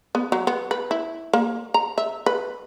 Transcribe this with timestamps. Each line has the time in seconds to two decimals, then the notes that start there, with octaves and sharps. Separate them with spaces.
0.15 B3
0.32 F#3
0.47 B3
0.71 B4
0.91 E4
1.33 A#3
1.74 A#5
1.98 E5
2.26 B4